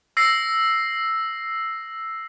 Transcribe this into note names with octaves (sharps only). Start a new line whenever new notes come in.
E6 A#6 C7